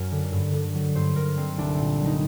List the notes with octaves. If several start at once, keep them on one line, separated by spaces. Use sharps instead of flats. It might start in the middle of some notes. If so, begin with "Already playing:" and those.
Already playing: F#2 F#3 A#4
D3
G2
D3
F#3
G2 C5
G2 A#4
D3 C4
C2 D4
C4
A#2
F#3
D#4